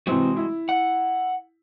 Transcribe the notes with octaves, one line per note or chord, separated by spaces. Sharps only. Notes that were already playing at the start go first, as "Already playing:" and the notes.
C3 E3 G#3 C4 F#4
E4
F#5